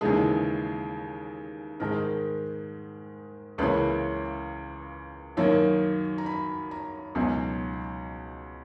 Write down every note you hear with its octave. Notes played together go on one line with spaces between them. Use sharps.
D#2 C#3 E3 G#3 G#4
G#2 D#3 G#3 A#4
C#2 C#3 E3 A#3 C#4 B4
F#2 D#3 F#3 A#3 C#5
A#5
B5
A#5
C#2 B2 F#3 B3 D#4 G#5